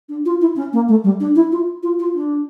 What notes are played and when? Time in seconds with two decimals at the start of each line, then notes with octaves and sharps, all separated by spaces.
0.09 D4
0.25 F4
0.41 E4
0.56 C#4
0.73 A#3
0.88 A3
1.04 G3
1.20 D4
1.35 E4
1.52 F4
1.83 F4
1.99 F4
2.14 D4